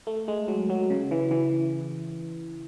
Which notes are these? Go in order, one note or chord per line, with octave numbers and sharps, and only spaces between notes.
A3
G#3
F#3
F#3
C#3
E3
E3